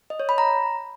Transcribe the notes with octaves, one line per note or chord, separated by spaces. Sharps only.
D#5
C#5
B5
A#5